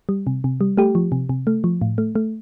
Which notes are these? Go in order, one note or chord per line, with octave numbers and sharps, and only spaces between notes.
G3
C3
C3
G3
A3 G4
F3
C3
C3
A3
F3
A2
A3
A3